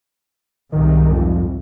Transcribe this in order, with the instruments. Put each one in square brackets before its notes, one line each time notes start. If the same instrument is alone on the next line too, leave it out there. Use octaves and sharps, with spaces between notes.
[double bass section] C2 G#2 [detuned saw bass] D#3
[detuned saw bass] F2